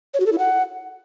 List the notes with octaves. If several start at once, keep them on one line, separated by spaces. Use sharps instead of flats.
C#5
F#4
A4
E4
F#5